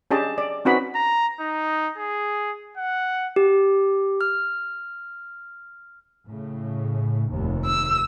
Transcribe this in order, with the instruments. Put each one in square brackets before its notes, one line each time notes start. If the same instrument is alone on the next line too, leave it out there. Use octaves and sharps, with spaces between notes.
[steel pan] C#4 D4 G4 G#4 D#5 A5
D5
C4 C#4 D#4 F#4 B4 B5
[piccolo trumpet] A#5
D#4
G#4
F#5
[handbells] G4
F6
[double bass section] A2 C#3
F1 D#2
[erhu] E6